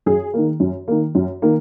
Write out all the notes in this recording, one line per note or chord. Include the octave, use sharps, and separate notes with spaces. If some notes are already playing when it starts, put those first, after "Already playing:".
F#2 G#4
D#3 A#3
F#2
D#3 A#3
F#2
D#3 A#3